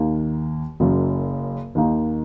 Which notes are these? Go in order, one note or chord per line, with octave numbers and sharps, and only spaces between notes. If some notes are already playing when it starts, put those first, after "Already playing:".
Already playing: D#2 D#3 A#3
F#1 F#2 C#3 F#3
D#2 D#3 A#3 D#4